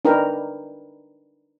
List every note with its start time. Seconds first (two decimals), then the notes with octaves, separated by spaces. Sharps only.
0.05 D4 D#4 A#4 B4 G5